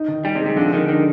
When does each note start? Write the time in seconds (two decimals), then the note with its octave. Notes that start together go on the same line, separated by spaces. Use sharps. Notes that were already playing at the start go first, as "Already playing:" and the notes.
Already playing: D#4
0.08 D#3
0.24 G3 D#4
0.36 C3
0.41 G#3
0.46 C3
0.56 D3 F3
0.73 D3 D#3
0.88 D3 D#3